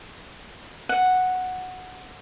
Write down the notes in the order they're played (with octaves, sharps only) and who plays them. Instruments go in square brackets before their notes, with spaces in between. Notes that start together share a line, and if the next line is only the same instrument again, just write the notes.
[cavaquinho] F#5